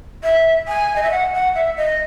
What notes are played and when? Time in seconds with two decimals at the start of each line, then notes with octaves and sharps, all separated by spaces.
0.23 E5
0.68 G#5
0.96 D#5
1.03 E5
1.11 F#5
1.34 F#5
1.55 E5
1.77 D#5